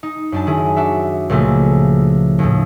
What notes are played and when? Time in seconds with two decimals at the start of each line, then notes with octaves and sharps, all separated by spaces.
0.03 D#4
0.32 F#2 D4 A5
0.47 D#3 E4 G#4
0.76 D4 F#4 E5
1.29 C#2 A#2 F3 A3 A#3
2.39 D#2 A2